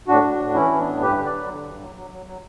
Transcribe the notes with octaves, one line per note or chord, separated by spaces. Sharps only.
A2 D4 F#4
A2
A2
E3 C#4 E4
E3
B3 D4
A2
G2 G4 B4
D3
B4 D5
F#3
D3
G2
F#3
F#3
F#3
F#3